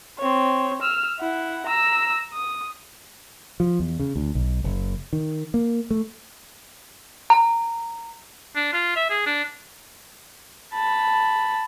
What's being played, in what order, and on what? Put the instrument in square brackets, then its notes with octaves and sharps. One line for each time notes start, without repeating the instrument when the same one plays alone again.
[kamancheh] C4 C#5
E6 F6
E4 F#5
A#5 E6
D#6
[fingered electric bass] F3
E2
C#3
D2
B1
F#1
D#3
A#3
A3
[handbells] A#5
[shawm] D4
F4
E5
G#4
D4
[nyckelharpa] A5 B5